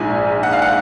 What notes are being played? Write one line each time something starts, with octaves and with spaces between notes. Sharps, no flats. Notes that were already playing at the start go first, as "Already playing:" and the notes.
Already playing: A#1 G#2 F3 G#5
F#5
F5
F#5